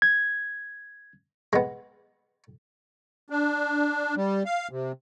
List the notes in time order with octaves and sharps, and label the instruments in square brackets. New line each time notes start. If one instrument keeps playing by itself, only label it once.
[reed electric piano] G#6
[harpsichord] G#3 B3
[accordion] D4
G3
F5
C3